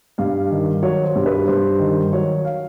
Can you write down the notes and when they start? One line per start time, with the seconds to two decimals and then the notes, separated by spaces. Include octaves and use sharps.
0.18 G2 F5
0.50 D#3
0.82 F#3 C#5
1.04 C5
1.16 G2
1.26 B4
1.48 G2 C5
1.80 D#3
2.13 F#3 C#5
2.45 F5